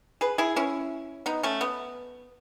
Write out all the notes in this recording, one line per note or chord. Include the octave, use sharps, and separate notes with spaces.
G#4 B4
E4 G#4
C#4 E4
B3 D#4
A3 C#4
B3